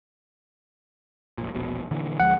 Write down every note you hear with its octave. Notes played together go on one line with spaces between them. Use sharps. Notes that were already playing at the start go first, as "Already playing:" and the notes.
F1 A#1 A#2
E1 A#1 B2
A#2 D3 E3
D2 F3 G#3 F#5